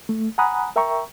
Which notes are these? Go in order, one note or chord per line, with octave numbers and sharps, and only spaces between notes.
A3
F#5 G#5 A#5 B5 D#6 F#6
A#4 E5 G5 A#5 C#6